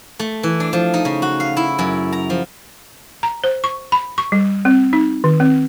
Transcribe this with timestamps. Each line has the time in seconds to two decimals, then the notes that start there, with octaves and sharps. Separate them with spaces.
0.19 A3
0.43 E3
0.60 D4
0.73 F3
0.94 D#4
1.05 C#3
1.22 F#4
1.40 F5
1.57 E4
1.79 F#2
2.12 A#5
2.30 F3
3.23 A#5
3.44 C5
3.64 C#6
3.92 B5
4.18 C#6
4.32 G3
4.65 C4
4.93 D#4
5.24 D#3
5.40 C4